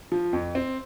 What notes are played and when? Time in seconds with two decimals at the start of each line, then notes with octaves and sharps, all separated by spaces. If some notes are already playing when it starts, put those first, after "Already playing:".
0.12 F3
0.33 F2
0.55 C4